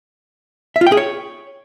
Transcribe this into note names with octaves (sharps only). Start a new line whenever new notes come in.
E5
F4
G5
G#4
C#5